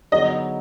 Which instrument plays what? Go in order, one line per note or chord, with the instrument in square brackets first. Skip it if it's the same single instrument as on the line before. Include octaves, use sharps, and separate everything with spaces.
[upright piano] D3 F#3 B3 D#4 G#4 [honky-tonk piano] D#5